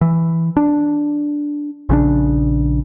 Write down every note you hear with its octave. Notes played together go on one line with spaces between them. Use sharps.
E3
D4
A#1 C#3 F3 D4